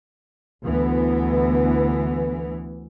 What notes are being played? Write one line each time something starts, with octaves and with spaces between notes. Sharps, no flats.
D2 E3 B3